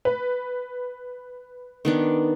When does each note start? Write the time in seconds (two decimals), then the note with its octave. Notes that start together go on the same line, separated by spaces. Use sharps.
0.05 B4
1.85 D#3 B3 D4